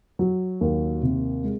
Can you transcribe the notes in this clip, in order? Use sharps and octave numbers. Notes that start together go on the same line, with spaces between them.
F#3
D#2
C3
G#3